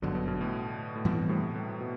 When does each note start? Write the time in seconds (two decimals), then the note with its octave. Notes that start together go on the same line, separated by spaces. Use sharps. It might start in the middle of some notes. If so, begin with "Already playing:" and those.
0.02 G1 F#2 B2 D3 F#3
0.15 B2
0.28 B2
0.41 A2
0.95 A2
1.05 G2 B2 E3 G3 C4
1.29 A2 C3
1.55 A2
1.80 B2